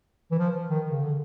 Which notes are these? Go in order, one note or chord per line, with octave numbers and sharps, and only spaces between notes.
E3
F3
D#3
C#3
D3